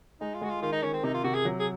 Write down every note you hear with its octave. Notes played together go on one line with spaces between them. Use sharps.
G#3 D#4
F4
G#3 F#4
F4
D#3 F4
D#4
D#3 C#4
C4
C3 D#4
F4
C3 F#4
G#4
F#3
G#4